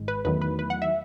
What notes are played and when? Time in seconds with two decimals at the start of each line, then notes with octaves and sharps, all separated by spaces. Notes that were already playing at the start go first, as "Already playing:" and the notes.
Already playing: G#1 G#2 G#3
0.08 B4
0.25 E2 D#3 F#3 A3 B4
0.42 B4
0.59 B4
0.70 F#5
0.82 E5